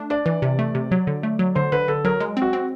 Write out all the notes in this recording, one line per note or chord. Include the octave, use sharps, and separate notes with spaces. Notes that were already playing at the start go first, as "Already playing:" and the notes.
Already playing: A3 D4
D4 D5
E3
C3
A3
C3
F#3
D3
A3
F#3
D3 C5
D3 B4
D3 A4
F#3 A#4
G#3
C4
F#4
C4